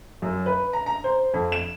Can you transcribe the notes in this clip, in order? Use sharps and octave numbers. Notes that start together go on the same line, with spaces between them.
F#2
B4
A#5
A#5
C5
F2
E7